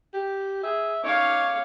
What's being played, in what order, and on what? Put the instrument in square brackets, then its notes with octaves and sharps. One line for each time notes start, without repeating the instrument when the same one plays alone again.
[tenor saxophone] G4
[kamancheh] G#4 [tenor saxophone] E5
[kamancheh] C#4 D6 [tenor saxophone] D#4 [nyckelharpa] C#5 F5